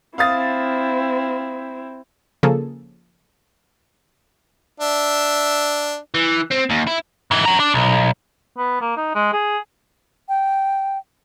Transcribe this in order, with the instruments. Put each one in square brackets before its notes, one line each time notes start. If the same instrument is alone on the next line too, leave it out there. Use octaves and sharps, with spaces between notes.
[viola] C4 E4 [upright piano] F5 D#6 A6
[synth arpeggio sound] C#3 F3 A#3 G#4 A4
[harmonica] D4 E5
[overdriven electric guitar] E3
C4
D#2
E4
[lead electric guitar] G#2 E3
C#4 A#5
D4
B1
[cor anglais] B3
A#3
D#4
G#3
G#4
[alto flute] G5